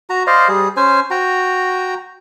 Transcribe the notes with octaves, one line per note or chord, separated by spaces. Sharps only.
F#4 A#5
C5 D5 D#5 F5
G3 G#4
C#4 C5 G#5
F#4 G5 A#5